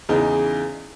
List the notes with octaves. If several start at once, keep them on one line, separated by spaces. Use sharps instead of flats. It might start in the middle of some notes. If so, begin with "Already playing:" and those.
E2 C#3 E3 D#4